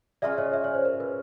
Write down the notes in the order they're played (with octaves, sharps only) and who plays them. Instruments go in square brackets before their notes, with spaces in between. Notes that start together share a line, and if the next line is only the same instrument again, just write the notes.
[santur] C#4 F4 G#4 [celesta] D5 E5
[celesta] C#5 D#5
D5 E5
C#5
C5
A#4
B4